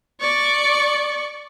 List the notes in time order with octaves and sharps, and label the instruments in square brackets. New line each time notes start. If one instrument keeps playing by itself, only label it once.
[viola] D5 C#6